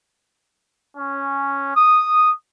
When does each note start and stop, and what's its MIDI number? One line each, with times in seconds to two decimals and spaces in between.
0.96 1.70 61
1.75 2.32 87